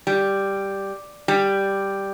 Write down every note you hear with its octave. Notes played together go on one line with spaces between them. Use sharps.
G3
G3